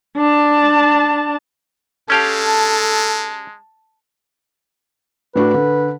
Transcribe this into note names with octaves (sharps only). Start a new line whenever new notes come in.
D4 A5
G#3 C#4 G4 A4 F5 A5
A2 D4 F#4 B4
D3